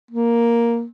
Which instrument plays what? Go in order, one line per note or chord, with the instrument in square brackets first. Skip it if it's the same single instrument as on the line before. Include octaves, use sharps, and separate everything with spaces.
[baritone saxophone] A#3